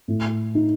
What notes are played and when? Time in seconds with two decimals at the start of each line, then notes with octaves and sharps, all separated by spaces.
0.08 A2
0.55 D#4